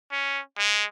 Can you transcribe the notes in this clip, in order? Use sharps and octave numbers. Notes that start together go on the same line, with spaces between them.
C#4
G#3